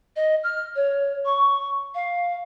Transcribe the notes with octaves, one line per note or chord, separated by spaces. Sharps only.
D#5
F6
C#5
C#6
F5